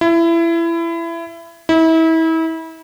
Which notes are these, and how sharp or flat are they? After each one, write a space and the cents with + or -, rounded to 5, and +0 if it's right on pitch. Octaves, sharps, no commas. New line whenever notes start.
E4 +25
E4 -30